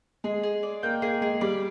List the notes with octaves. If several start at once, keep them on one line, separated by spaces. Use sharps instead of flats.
G#3 G#4
G#4
D5
A#3 G5
A#3 G#4
G#3 G#4
G3 D5